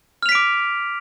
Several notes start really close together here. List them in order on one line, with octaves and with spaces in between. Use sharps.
F6 F7 B6 D7 D6